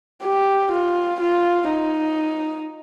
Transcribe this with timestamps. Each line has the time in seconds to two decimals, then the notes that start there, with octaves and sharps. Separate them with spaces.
0.23 G4
0.72 F4
1.20 F4
1.69 D#4